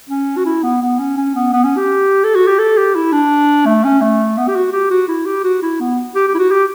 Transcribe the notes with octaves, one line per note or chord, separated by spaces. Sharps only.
C#4
F#4
E4
B3
B3
C#4
C#4
B3
B3
C#4
G4
A4
F#4
G4
A4
G4
E4
D4
A3
C#4
A3
B3
G4
F#4
G4
F#4
E4
G4
F#4
E4
B3
G4
G4
E4
F#4
G4